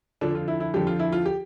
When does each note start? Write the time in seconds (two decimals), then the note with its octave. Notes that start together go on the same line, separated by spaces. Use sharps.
0.21 F2 D3 F3 D4
0.35 F4
0.48 E4
0.60 E4
0.74 F2 D3 F3 G4
0.87 F4
1.00 E4
1.12 F4
1.26 G4